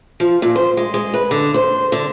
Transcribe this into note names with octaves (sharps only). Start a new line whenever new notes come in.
F3
A#2
C5
G#3
G#3
B4
D3
C5
D3